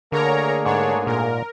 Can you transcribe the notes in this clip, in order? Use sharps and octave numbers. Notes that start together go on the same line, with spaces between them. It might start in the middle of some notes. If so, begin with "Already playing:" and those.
D3 A3 A#3 G#4 A#4 C#5 A#5
G#2 D4 C#5
A#2 A#4